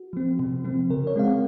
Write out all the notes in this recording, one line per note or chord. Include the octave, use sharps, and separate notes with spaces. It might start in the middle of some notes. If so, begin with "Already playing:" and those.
Already playing: F#4
F3 C4
C3
F3 C4
C#3 A#4
C#5
G#3 C4 F5
F#5